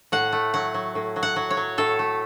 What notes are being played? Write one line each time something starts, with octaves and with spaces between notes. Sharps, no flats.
A2 F#5
A3
F#3 F#5
F#3
A2
F#3
F#5
F#3
C#5
F#3
A2 A4
A3